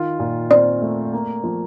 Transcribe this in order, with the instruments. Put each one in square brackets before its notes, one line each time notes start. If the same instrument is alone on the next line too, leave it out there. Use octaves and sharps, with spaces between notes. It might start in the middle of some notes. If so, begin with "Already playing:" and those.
Already playing: [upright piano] D#3 F4
A#2
[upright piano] C4 [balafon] D5
[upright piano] A3
A#3
F3